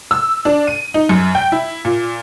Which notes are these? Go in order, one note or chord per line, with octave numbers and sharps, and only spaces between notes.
E6
D4
D#7
D#4
F#2
G5
E4
A#2